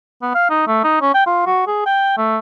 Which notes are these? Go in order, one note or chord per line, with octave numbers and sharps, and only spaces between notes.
B3
F5
D#4
A3
D#4
C#4
G5
F4
F#4
G#4
G5
A3